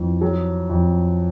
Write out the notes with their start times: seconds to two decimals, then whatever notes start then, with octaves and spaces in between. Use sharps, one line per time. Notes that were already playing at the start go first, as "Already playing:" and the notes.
Already playing: F2 E3
0.21 F#3
0.70 F2